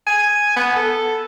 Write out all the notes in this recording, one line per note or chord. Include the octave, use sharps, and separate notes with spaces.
G#5
B3
A4